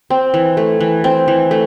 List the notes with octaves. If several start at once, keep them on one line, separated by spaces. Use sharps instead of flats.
C4
E3
A3
E3
C4
E3
A3